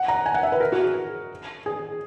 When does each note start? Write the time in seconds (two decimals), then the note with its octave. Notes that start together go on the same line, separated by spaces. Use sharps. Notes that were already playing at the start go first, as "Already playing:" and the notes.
Already playing: F#5
0.08 A#5
0.26 G#5
0.34 F#5
0.43 E5
0.52 B4
0.60 A#4
0.72 F#4
0.84 G#4
1.66 G#4